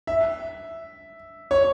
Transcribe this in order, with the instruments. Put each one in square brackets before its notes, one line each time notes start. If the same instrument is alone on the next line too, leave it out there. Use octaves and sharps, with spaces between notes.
[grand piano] E5
C#5